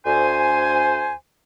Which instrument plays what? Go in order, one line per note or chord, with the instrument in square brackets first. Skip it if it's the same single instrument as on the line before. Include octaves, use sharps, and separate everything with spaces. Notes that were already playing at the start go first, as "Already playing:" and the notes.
[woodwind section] D2 C5 G#5